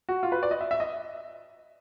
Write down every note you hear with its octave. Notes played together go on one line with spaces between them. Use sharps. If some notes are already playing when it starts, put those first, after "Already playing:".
F#4
F4
B4
D5
D#5
E5
E5
D#5